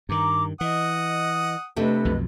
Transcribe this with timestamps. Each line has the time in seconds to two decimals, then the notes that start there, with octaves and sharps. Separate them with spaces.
0.09 G2 D#3 A#5 D6
0.61 E3 D#5 F#5 D#6
1.76 C3 A3 D4 B4 D#5
2.05 B1 F2 B2